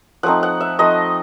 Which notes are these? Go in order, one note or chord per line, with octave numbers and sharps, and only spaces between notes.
F3 A3 C4 D#4 F#5
F#5
E5
F3 A3 C4 D#4 D#5